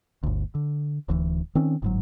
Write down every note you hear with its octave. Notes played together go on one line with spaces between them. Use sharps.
G1 D2
D3
D1 D2 E3
D#3 C4 C#4
G1 G#2 F#3